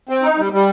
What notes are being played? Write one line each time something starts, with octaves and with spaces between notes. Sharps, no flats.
C4
D#4
G3
G3